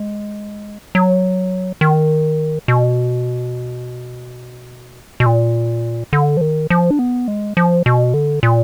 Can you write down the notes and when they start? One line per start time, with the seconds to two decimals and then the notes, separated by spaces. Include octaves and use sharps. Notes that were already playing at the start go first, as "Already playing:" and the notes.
Already playing: G#3
0.95 F#3
1.81 D#3
2.68 B2
5.20 B2
5.26 A#2
6.13 D3
6.37 F3
6.41 D#3
6.70 F3
6.91 D4
6.99 B3
7.28 G#3
7.57 F3
7.86 B2
8.14 D3
8.43 A#2